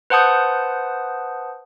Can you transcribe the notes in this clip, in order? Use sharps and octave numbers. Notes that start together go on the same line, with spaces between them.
B4 C5 F#5 A5 D#6 G6